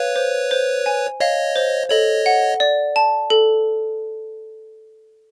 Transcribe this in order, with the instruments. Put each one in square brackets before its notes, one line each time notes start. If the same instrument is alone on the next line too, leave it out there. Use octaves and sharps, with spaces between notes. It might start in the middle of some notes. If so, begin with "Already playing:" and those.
Already playing: [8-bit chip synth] B4 C#5 [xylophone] F5
[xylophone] C5
C5
G#5
[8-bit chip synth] C#5 D#5 [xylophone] F5
[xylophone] C5
[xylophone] A4 [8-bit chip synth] C#5 D#5
[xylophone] F#5
D5
A5
A4